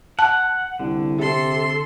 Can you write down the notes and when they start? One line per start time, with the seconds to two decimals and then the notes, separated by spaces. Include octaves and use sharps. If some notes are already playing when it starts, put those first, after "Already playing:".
0.19 F#5 A5
0.80 C2 D3
1.19 C3 A4 C6